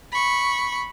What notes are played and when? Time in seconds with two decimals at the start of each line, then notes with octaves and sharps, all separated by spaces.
0.12 B5 C#6